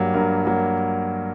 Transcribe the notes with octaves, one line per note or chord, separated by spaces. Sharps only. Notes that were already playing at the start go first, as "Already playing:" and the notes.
Already playing: G2 F#3 A#3 G4
G2 A#4
F#3 A#3